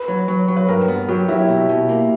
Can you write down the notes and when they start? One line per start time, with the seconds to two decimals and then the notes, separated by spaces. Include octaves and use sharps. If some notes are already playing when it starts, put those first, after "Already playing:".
Already playing: B4
0.08 F#3
0.28 F#3
0.48 F#3
0.56 B4
0.69 G2 A#4
0.88 B3
1.08 F#3 G4
1.28 F#3 E4
1.49 B2
1.69 B2
1.89 A#3